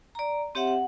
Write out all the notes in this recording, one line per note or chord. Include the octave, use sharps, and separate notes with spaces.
D5 A#5
C4 G4 C#5 E5 F#5
F#5